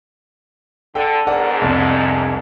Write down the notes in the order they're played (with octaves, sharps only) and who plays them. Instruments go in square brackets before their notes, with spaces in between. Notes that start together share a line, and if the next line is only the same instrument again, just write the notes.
[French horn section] D3 [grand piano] A4 G5
[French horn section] E2 G#2 D4 [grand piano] A#4 D5 F#5
[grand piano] C2 F2